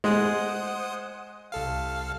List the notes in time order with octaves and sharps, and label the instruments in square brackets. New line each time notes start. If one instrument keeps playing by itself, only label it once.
[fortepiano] G#3 [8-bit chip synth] C5 F#5 D#6
[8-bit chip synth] C2 A4 F5